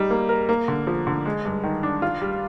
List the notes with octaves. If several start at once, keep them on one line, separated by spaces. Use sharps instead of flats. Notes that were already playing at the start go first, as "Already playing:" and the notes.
Already playing: G3 D#4
A#3
A#4
A#3
D3
F3
D3
G#3
G2
D#3
D4
F4
G3